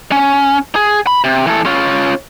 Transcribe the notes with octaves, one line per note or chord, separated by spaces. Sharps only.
C#4
G#4
B5
C3
E3 A4
C#4 F4